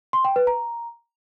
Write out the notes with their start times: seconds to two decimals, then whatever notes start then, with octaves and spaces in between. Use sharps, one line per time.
0.13 C6
0.25 G5
0.36 B4
0.47 A#5